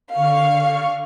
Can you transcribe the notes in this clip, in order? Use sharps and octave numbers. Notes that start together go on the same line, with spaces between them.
D3 F5 C#6 F6